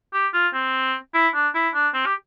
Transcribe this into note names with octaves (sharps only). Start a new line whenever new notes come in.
G4
F4
C4
E4
D4
E4
D4
C4
G4